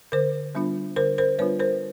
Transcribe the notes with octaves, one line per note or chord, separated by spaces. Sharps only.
D3 A#4 C5
G3 B3 D4 F4
D3 A#4 C5
A#4 C5
G3 B3 D4 F4 B4 C#5
A#4 C5